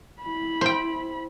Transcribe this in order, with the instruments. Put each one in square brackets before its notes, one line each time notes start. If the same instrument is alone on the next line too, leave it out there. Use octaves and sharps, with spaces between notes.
[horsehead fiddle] E4 B5
[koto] C5 G5